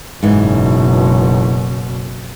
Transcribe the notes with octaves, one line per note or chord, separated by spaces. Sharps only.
F#1 G#2 B2 E3